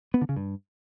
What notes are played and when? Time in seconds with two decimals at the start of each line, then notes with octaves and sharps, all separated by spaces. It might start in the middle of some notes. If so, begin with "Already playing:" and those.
0.14 B3
0.21 D3
0.29 C#3
0.36 G2